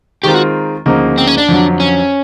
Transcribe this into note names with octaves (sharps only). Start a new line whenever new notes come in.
D#3 G#3 C4 F4 G4 A#4
F#4
D2 C#3 F3 A#3 D#4
C4
C#4
D4
F2 D3 F#3
C#4